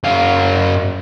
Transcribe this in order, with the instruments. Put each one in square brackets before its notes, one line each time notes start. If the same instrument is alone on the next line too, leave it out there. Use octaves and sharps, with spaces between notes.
[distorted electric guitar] F#2 F5